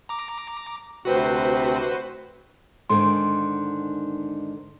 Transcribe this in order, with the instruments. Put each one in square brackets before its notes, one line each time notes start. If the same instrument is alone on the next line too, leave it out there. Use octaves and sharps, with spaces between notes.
[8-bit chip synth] A#5 D6
[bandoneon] D2 C3 C4 [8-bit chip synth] F#4 B4 C5
[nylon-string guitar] G#2 D3 D#3 [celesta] C6